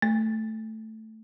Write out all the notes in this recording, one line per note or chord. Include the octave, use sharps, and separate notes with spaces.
A3